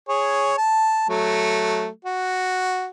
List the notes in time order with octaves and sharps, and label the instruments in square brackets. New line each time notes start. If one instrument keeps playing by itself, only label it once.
[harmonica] G#4 C#5
A5
F#3 A3
F#4